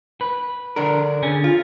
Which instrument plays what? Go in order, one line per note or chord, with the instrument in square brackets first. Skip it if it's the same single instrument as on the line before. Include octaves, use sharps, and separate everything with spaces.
[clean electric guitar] B4
[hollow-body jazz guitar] D3 D4 A#4
[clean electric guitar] D3 C#4 G#4
[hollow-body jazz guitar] F4